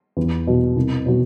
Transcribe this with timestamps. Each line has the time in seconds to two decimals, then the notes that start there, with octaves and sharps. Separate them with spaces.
0.17 E2
0.47 B2 F#3
0.76 C2
1.06 B2 F#3